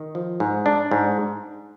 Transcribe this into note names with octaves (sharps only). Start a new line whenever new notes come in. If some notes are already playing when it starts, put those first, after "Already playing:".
Already playing: D#3
F3
G#2
D4
G#2